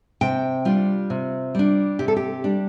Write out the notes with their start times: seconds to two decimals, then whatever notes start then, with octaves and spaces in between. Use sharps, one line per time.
0.21 C3 G5
0.65 G3 D4 F4
1.10 C3
1.55 G3 D4
1.99 C3 G4
2.08 A4
2.16 G4
2.44 G3 D4